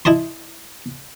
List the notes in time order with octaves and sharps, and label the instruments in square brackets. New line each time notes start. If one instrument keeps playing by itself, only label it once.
[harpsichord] E4 D#5 A5 C6